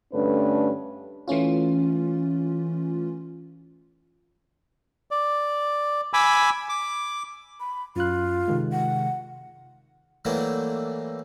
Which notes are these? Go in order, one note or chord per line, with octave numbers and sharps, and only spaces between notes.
G2 D3 A3 C#4 D4 B4
E3 A3 C#4 F4
D5
G#5 B5 D6 E6
D6
B5
F#2 F4 F#6
C3 D#3 G#3
F#5
E3 F#3 G3 A3 A#3 E4